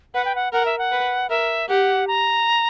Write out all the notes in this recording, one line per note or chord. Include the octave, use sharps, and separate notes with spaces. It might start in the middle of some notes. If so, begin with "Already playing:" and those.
B4 F#5
G5
F#5
A#4 F#5
E5
F#5
B4
A#4 E5
G4 F#5
A#5